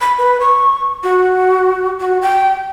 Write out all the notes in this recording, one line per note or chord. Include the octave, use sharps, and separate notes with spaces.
B5
B4
C#6
F#4
F#4
G5